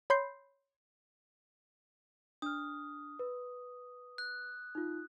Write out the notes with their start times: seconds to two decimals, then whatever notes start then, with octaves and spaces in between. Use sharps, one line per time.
0.10 C#5 B5 C6 G6 C7
2.42 D4 D#6 F6
3.19 B4
4.18 F#6
4.75 D#4 F4